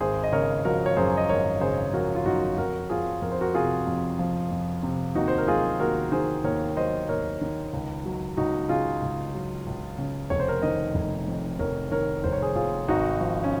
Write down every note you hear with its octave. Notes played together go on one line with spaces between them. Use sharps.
G#1 G#4 C5
D#5
C#3 A#4 C#5
F3 F#4 A#4
C#5
F#2 G#4 C5
D#5
G#1 A#4 C#5
C#3 G#4 C5
F3 F#4 A#4
F4
F#2 D#4 F#4
F2 F#4 A#4
F3 F4 G#4
F2 A#4
C5
F#4 A#4
C3 F4 G#4
F2
F3
F2
C3
D#2 D#4 F#4
C5
A#4
F#3 F4 G#4
D#2 F#4 A#4
D#3 G#4 C5
D#2 A#4 C#5
F#3 C5 D#5
D#2 A#4 C#5
D#3
C#2
F#3
C#2 D#4 F#4
C#3 F4 G#4
C#2
F#3
C#2
C#3
F1 C#5
C5
A#4 C#5
D#3 C5 D#5
F1
F2
F1 A#4 C#5
D#3 A#4 C#5
F1 C5
C#5
G#4 C5
F2 F4 G#4
G#1 D#4 F#4
F3
C#4